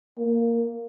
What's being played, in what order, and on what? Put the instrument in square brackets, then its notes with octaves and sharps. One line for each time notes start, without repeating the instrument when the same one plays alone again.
[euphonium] A#3